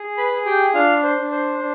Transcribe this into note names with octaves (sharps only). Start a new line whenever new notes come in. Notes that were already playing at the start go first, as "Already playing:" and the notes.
Already playing: G#4
B4 B5
G#4
G4 G5
D4 F4 F5
C5
D4
C5
D4